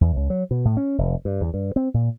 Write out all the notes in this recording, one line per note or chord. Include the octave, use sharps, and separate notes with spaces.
E2
C#2
F#3
B2
A2
C#4
F1
G2
E2
G2
C4
A#2